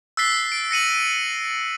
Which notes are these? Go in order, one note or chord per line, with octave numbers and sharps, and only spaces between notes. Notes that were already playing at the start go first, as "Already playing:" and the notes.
E6 F#6 A6 B6 C7 G7
D7
A#6 C#7 D#7 F#7
D#7